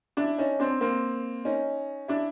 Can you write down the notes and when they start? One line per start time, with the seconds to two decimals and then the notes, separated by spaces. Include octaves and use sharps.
0.17 D4 E4
0.38 C#4 D#4
0.59 C4 D4
0.81 A#3 C4
1.45 C#4 D#4
2.08 D4 E4